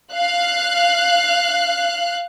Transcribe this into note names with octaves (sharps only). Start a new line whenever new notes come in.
F5 F#6